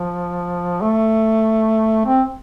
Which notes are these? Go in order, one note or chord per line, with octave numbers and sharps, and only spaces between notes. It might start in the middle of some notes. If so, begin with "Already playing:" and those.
Already playing: F3
A3
C4